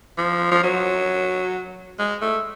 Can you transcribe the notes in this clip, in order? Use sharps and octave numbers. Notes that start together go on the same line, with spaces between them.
F3
F3
F#3
G#3
A3